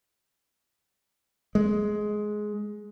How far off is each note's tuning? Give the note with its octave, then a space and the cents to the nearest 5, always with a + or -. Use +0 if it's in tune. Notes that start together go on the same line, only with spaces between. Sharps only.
G#3 +15